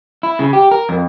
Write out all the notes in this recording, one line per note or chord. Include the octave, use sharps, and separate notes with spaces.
E4
C#3
G4
A#4
F2